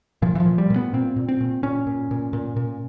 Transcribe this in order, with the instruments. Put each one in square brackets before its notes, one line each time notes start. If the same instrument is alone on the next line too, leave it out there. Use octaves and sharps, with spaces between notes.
[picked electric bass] A#2 F3
E3
F3
A#2
G3
A#2
B3
A#2 C4
A#2
C4
A#2
A#2 C#4
A#2
A#2
A#2
A#2